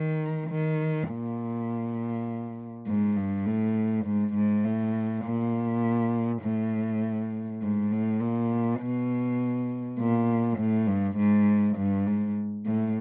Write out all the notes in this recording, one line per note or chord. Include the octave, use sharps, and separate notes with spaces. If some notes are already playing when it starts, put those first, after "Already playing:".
Already playing: D#3
D#3
A#2
G#2
G2
A2
G#2
G#2
A2
A#2
A2
G#2
A2
A#2
B2
A#2
A2
G2
G#2
G2
G#2
A2